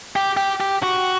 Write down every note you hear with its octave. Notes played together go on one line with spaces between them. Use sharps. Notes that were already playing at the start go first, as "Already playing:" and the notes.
G4
G4
G4
F#4